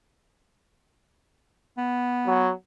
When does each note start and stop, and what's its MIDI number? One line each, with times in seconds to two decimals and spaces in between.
1.77 2.51 59
2.27 2.52 54